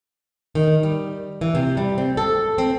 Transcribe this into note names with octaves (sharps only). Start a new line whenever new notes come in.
D#3
G3
E3
C3
G3
C4
A4
C4